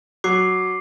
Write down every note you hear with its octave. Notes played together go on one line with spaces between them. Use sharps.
F#3 D6 C7